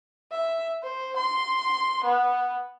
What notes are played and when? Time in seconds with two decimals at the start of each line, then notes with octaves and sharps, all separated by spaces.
0.31 E5
0.82 C5
1.16 C6
2.04 B3